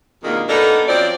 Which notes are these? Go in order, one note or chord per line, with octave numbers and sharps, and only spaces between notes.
F2 B2 D#3 G#3 A#3 D4
A#3 B3 D4 D#4 A4
F#2 F3 F#3 C4 D5